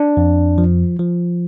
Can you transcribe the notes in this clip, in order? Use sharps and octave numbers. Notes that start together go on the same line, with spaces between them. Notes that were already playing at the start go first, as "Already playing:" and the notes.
Already playing: D4
F2
F3
F3